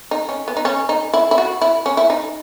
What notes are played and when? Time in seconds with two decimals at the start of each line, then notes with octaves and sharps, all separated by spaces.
0.11 D#4
0.29 C#4
0.48 B3
0.57 D#4
0.65 C#4
0.89 D#4
1.14 E4
1.31 E4
1.38 F#4
1.61 E4
1.86 C#4
1.97 E4
2.10 D#4